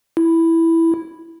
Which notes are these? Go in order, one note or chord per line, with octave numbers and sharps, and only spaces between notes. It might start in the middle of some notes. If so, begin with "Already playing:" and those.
E4